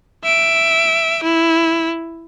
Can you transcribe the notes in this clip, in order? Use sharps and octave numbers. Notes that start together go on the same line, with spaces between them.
E5 D7
E4